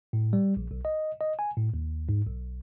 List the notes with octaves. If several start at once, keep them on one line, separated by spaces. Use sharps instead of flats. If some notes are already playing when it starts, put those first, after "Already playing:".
A2
G3
A#1
B1
D#5
D#5
G#5
A2
D#2
G#2
B1